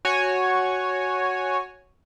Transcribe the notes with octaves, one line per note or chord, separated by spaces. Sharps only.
F#4 C#5 G#5